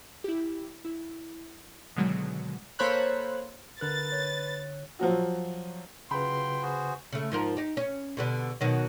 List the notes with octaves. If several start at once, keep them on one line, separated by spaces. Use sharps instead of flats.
E4 G4
E4
B2 D3 D#3 F#3 G#3
A#3 A4 C5 C#5 B5 F#6
D3 A#4 B4 F#6 A6
C#5
F3 F#3 F#4
C#3 F#3 F4 B4 G5 B5 C6
F#4 G#4 C5
C#3 A3
G#2 F3 A#4
D#4 G4
C#4
B2 D3 G3
B2 D#3 F#3